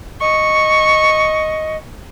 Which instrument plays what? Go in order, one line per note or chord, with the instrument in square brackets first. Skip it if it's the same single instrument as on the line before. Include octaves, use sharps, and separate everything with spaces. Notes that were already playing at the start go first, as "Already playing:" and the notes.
[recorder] D#5 [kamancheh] C#6